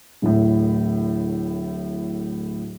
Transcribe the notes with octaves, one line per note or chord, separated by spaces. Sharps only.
D1 A2